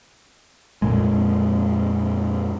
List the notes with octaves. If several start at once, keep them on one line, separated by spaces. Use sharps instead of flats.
F2 A#2 G#3